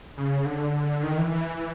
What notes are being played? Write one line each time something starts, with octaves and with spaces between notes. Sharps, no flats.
C#3
D3
D#3
E3
E3